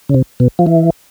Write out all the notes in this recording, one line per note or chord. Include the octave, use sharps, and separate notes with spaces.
C#3
C3
B2
F3
E3